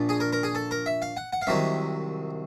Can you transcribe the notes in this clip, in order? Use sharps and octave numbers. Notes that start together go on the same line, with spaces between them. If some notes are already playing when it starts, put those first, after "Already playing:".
Already playing: A#1 A#2 F3
G#4
A#4
A#4
G#4
A4
A#4
E5
F5
F#5
F#5
F5
C2 C3 D#3 F#3 E5